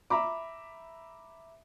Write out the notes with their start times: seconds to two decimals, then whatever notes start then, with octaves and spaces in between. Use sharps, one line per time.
0.10 E5 A#5 B5 D6